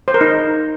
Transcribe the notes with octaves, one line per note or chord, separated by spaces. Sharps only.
C5
A#4
D#4